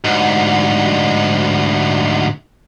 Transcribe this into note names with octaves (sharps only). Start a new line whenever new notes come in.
D2 G#2